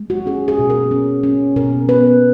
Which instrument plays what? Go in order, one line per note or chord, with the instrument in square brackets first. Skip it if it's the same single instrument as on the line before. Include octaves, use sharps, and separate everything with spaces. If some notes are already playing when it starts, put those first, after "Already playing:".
Already playing: [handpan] G#3
F#4
C#4 G#4
G#4
B2
A#4
C#4
C#4
B2 A#4
B3 B4